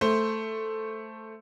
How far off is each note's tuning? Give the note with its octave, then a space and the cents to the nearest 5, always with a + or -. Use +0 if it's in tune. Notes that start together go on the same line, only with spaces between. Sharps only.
A3 +0 C5 +0